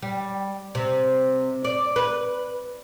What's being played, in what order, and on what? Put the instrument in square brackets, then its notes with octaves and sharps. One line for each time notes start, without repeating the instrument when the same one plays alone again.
[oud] G3
C3
D5
B4